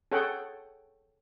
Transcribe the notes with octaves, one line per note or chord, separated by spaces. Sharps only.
G#4 A4 C#5 F#5 G5